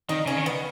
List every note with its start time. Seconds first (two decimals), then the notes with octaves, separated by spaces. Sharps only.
0.09 D#3 D#4
0.26 C#3 C#4
0.37 D#3
0.46 B3